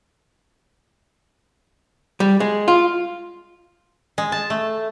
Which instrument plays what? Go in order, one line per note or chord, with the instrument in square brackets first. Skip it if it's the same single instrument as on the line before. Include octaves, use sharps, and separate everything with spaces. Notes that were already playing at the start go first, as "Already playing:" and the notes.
[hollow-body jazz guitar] G3
G#3
F4
[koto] G#3
A5
A3